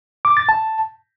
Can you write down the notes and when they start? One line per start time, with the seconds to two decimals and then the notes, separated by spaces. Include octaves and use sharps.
0.25 D6
0.37 A6
0.49 A5